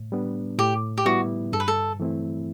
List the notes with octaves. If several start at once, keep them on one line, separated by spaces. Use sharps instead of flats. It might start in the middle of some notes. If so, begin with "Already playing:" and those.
Already playing: A2
G3 B3 D4
A2 G4
G4
G3 B3 E4 F#4
G2 A4
B4
A4
E3 A3 C4 E4